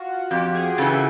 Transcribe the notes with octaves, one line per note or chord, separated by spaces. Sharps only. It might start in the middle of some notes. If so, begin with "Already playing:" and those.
Already playing: F4 F#4
F2 G4
G#4
C#3 E3 A4